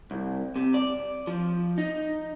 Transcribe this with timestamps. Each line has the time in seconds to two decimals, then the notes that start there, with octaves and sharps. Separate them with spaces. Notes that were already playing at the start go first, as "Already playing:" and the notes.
0.11 C2
0.56 C3
0.74 D5
1.27 F3
1.78 D#4